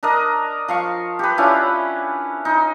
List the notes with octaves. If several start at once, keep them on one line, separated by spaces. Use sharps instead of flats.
D4 A#4 D#5
F3 F5 C#6
G4 B4
C#4 D4 E4 F4
D#4